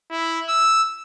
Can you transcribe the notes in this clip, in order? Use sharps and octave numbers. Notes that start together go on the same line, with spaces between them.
E4
E6